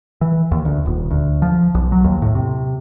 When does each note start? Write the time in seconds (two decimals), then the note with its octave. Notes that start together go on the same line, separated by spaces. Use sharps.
0.21 E3
0.52 D#2
0.65 D2
0.86 D#1
1.10 D2
1.42 F3
1.75 B1
1.92 F#3
2.04 D#2
2.22 A2
2.35 C3